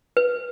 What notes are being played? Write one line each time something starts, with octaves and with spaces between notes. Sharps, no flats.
B4